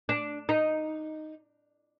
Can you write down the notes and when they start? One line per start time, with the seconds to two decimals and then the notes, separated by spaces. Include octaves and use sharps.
0.09 D4
0.49 D#4